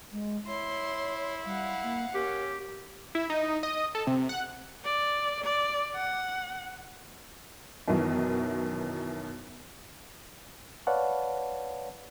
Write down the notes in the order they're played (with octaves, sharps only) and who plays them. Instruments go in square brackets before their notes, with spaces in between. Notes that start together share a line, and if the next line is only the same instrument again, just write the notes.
[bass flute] G#3
[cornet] E4 [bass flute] C#5 [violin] C6
[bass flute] G3 [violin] F5 F#5
[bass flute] A#3
[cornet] C#4 [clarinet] G4 [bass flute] A#4
[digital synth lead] E4
D#4
D#5
A4
C3
F#5
[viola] D5
D5
F#5
[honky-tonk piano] F#2 B2 D#3 E3 F#3
[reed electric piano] B4 C#5 D5 F5 F#5 A5